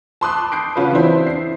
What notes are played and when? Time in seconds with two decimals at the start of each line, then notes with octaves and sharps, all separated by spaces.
0.21 A5 B5 C6 D6 D#6 F#6
0.52 G6 C7 D7
0.76 C#3 C#4 F4 F#4 B4
0.93 E3 C4 D4 E4 C5
1.27 C7